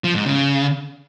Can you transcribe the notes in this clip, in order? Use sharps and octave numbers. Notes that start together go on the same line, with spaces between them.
F3
G#2
C#3